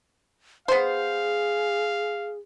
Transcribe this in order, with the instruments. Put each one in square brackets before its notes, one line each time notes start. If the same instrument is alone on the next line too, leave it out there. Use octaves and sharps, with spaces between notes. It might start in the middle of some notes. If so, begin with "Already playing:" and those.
[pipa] B3 C5 [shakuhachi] G#4 [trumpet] F5